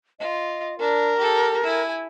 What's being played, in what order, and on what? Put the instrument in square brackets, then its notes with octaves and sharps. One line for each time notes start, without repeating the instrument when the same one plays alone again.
[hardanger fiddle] F4 [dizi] D#5
[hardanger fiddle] D4 [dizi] A#4
[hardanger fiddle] G4 A4
E4 G#5